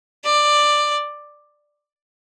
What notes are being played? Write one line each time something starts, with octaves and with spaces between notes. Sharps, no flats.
D5